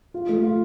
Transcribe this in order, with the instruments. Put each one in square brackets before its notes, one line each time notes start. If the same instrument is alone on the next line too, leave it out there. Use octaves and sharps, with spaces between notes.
[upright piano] F4
A3
F4